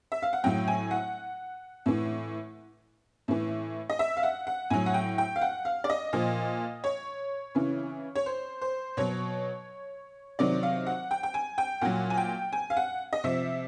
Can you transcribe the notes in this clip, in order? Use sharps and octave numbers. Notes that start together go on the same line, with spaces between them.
E5
F5
F#5
A2 F#3 G5
G#5
F#5
A2 E3
A2 E3
D#5
E5
F5
F#5
F#5
A2 F#3 G#5
F#5
G5
G5
F5
F#5
F5
D5
D#5
A#2 F3
C#5
C#3 E3
C#5
C5
C5
B2 F#3 C#5
C3 D#3 F#3 D5
F5
F#5
G5
G5
G#5
G5
A#2 F#3 F#5
G#5
G5
G#5
F5
F#5
D#5
C3 F3 E5